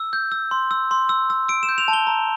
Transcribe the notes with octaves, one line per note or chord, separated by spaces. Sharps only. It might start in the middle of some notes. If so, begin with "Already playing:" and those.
Already playing: E6
G6
E6
C6
E6
C6
E6
E6
E6 D7
E7
G6
F7
A5
G7
A#5